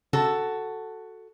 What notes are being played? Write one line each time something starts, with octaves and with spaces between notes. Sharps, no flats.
C#3 F#4 A4 A5